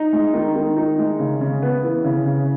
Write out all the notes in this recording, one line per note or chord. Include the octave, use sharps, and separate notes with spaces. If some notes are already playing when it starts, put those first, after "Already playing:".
Already playing: D#4
G#3
D#3
D#3
D#4
G#3
C#3
C#3
B3
E3
C#3
C#3